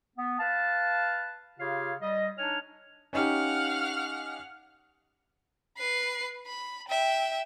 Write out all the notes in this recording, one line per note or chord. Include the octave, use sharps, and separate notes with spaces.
B3
B4 F5 A5
C#3 F4 G4 C#5 F5
G3 D#5
D4 D#4 C#5 G#5 F6
C#4 D#4 G4 F5 F#5 F6
B4 C7
B5
E5 G5